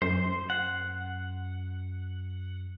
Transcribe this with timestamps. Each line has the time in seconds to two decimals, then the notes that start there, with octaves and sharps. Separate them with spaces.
0.02 F#2 C5
0.50 F#5